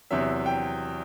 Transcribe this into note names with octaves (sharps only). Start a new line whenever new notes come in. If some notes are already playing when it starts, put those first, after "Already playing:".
E2 C3 F#3 E5
G5